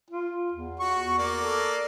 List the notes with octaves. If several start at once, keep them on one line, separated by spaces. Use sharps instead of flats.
F4
E2
F#4 C#6
A#3 D5
A4